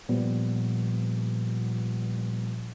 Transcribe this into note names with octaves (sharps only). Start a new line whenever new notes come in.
A#2 F3 G3 B3